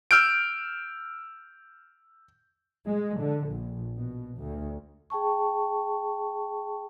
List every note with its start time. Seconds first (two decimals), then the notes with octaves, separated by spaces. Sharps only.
0.11 E6 F6 G6 D7
2.87 G#3
3.18 D3
3.48 A#1
3.99 B2
4.39 D2
5.10 G#4 G5 A5 C#6